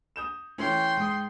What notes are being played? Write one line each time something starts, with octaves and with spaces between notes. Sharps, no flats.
D#6 G6 E7
E3 A3 C#4 G5 C6
G#2 D#6